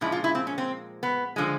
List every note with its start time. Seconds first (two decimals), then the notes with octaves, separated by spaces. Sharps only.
0.01 A#2 F3 G#3 E4
0.12 F4
0.24 E4
0.35 C4
0.47 C#4
0.58 C4
1.03 B3
1.36 D3 F3 G#3